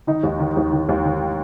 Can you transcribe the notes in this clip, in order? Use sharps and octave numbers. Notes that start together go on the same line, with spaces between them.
D#3 D#4
D#2
D#3
D#2
D#3
D#2
D#3